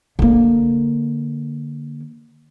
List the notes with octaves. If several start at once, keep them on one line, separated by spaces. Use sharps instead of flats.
D3 A#3